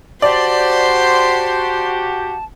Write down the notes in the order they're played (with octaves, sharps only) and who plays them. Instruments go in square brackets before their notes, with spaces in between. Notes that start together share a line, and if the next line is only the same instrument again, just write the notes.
[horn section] F#4 G4 [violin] C5 C6 [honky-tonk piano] D5 [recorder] A5